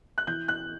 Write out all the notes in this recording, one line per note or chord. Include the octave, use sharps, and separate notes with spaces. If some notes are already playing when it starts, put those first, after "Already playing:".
F#6
E3 G6
F#6